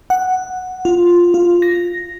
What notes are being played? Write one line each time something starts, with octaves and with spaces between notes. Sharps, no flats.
F#5
F4
F4
A#6